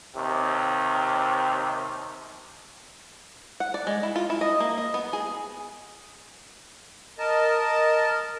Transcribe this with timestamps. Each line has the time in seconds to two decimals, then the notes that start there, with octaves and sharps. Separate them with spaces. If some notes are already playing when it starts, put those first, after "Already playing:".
0.16 D#2 C3
3.60 F#5
3.74 D5
3.87 G#3
4.03 E4
4.16 F4
4.30 E4
4.41 D#5
4.60 A#3
4.78 D#5
4.94 B3
5.13 G#4
7.18 A#4 D#5 A5